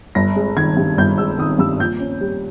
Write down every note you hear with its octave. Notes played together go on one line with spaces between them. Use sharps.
G1 A#6
G#3
D#3 G#6
G2
G1 G6
G#3 E6
D#3 D#6
G2 E6
A#1 G6
C#4
G3